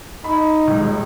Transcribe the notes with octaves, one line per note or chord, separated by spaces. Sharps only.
D#4 B5
D#1 C#2